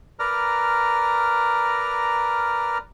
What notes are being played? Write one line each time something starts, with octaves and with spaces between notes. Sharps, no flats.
A#4 B4 D5 A#5 F6